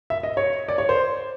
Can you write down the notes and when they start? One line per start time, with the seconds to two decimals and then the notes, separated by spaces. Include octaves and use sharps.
0.10 E5
0.23 D#5
0.37 C#5
0.68 D5
0.78 C#5
0.89 C5